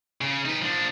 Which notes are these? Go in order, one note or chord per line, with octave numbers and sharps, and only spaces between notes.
C#3
D#4 B4
F3 D4